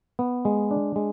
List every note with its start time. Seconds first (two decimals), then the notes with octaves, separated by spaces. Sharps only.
0.19 B3
0.45 G#3
0.71 D4
0.96 G#3